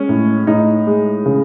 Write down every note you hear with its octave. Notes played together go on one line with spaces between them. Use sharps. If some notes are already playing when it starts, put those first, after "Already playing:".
Already playing: G#3 C#4
A2
A2 D#4
G#3
C#3